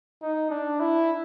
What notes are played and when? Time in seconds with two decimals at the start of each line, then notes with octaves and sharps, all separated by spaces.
0.22 D#4
0.50 D4
0.80 E4